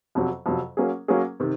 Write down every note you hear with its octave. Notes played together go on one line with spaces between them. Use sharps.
F2 C3 F#3
F2 C3 F#3
F#3 A#3 C#4 G#4
F#3 A#3 C#4 G#4
C3 D#3